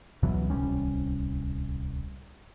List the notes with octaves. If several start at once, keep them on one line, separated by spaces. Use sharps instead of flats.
C#2 B2 E3 F#3
D1 C2 G3 C#4